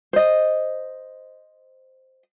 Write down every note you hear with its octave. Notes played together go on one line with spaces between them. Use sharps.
C5 D#5